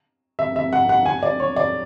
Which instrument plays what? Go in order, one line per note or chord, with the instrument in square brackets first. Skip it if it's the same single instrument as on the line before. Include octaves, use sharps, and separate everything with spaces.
[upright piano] E5
E5
F#5
F#5
G#5
D5
C#5
D5